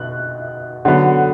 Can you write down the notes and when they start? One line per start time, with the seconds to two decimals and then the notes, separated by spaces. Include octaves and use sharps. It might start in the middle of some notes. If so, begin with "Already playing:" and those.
Already playing: B2 F#6
0.85 D3 F#3 B3